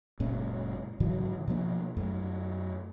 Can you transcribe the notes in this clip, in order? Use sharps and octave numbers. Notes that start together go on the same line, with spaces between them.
F#1 A#2 G#3 C#4
G#2 C#3 E3 F#3
B2 F3 A#3 D4
F#2 A3